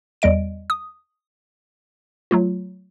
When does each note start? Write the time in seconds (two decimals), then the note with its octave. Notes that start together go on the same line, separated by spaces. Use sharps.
0.22 E2 G3 D#5 D7
0.70 D#6
2.31 F#3 A3 F4